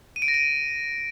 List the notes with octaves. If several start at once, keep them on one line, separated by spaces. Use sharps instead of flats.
D#7
D7
A#6
D#7